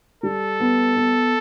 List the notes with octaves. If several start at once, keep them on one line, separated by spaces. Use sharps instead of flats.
G3 A4
B3
B3